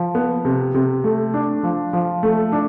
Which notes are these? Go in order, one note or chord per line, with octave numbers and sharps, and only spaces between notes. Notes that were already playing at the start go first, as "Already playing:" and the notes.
Already playing: F3
B3
C3
C3
A3
D4
F3
F3
A3
D4